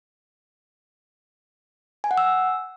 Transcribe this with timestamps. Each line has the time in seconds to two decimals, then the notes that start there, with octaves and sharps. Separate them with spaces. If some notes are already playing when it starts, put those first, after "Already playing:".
2.04 G#5
2.11 F#5
2.18 E6